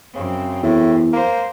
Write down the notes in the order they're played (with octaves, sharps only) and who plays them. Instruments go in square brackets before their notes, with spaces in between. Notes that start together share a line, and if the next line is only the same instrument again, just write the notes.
[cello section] F#2 C4 [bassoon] C#3
[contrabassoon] E2 [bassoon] A2
[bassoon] A#3 [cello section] C5